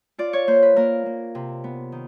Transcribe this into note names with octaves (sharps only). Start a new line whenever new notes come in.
F4 D5
C#5
A#3 C5
B4
A#3 A#4
A#3
C3
B3
D#3